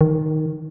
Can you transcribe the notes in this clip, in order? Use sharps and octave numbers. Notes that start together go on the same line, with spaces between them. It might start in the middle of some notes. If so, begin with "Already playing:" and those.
D#3